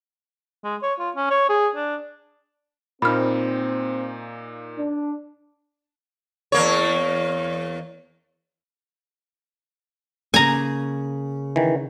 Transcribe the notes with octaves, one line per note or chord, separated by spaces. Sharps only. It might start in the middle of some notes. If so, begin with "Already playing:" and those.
G#3
C#5
F4
C#4
C#5
G#4
D4
A#2 A#3 C4 D#4 B5 F6
D4
E2 A#3 C#5
C#3 A#3 G#5 A#5
D#3 E3